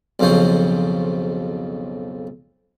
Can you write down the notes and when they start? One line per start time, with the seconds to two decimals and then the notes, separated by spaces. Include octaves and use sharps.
0.20 B1 F2 C#3 F3 C5 C#5